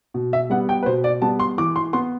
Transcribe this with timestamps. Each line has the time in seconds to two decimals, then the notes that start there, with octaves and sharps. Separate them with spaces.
0.14 B2
0.33 E5
0.50 G3 B3 F#5
0.69 G5
0.83 B4
0.86 B2 C5
1.04 D5
1.22 G3 B3 A5
1.39 C6
1.58 E3 D6
1.76 C6
1.93 B3 C6